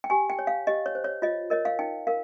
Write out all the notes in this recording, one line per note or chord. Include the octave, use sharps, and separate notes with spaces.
G5
G4 G#5
G5
C#5
F5
G4 D#5
C#5
C5
C#5
F4 D#5
A#4 C#5 D#5
F5
D#4 G5
A#4 F5